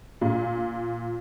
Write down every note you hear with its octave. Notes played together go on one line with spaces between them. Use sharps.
A#2